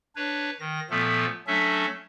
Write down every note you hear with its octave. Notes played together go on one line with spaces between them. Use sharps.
D4 B4 C#5
D#3 A#6
A#2 F3 A3 B3 A4
F#3 A3 C#4 D4 A4 E5